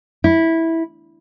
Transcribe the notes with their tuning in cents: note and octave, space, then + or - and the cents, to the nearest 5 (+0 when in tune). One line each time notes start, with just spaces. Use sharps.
E4 -10